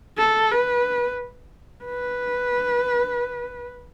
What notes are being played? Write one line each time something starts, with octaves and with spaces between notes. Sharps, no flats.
A4
B4
B4